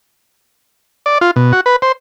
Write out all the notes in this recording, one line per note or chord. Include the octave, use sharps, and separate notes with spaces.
D5
F4
B2
F#4
B4
C5